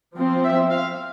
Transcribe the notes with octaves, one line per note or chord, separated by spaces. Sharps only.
F3 C4
E5
F5